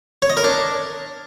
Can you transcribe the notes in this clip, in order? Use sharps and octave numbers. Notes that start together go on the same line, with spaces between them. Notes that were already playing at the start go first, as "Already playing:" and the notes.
C#5
D#5
A#4
D4